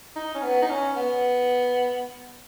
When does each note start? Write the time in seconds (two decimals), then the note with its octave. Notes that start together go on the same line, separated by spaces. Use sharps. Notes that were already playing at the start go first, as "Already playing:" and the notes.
0.16 D#4
0.34 C#4
0.42 B3
0.62 D#4
0.70 C#4
0.96 B3